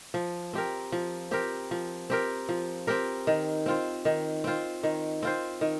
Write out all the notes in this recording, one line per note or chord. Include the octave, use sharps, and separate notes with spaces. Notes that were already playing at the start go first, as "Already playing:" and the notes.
F3
C4 G4 A#4
F3
C4 G4 A#4
F3
C4 G4 A#4
F3
C4 G4 A#4
D#3
C4 F4 C5
D#3
C4 F4 C5
D#3
C4 F4 C5
D#3